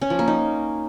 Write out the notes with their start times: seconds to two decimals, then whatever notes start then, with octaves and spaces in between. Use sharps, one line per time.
0.01 C#4
0.10 F3
0.19 A#3
0.28 D#4